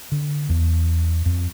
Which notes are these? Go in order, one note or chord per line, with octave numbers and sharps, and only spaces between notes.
D3
E2
F2